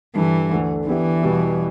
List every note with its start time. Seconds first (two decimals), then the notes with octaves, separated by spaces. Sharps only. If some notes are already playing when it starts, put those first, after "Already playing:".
0.15 G2 D3 E3 G3
0.51 D2 D3 A3
0.87 D3 E3 B3 E4 G4
1.23 E2 B2 G3 B3